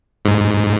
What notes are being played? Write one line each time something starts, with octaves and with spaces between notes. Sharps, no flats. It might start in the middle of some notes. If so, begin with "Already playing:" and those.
G#2